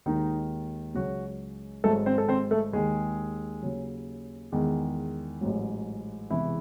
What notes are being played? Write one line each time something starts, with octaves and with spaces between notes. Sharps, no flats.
D#2 D#3 G#3 D#4
C#2 C#3 F#3 F#4
G#1 G#2 F#3 A3 A4
C4 C5
A4
C4 C5
A3 A4
D#2 D#3 G#3 G#4
D#2 C#3 F#3
E2 D#3 G#3
A1 G#2 F#3
E1 E2 C3 E3 E4